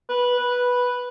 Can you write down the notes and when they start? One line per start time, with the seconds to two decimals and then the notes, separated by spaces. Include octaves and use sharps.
0.09 B4
0.38 B4